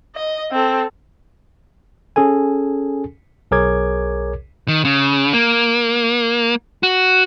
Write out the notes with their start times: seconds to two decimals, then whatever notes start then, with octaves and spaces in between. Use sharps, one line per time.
0.16 D#5
0.52 C4 A4
2.16 C#4 G#4 A4 G#5
3.51 B1 G#4 A#4 C#5 D6 G#6
4.68 D#3
4.85 C#3
5.33 A#3
6.83 F#4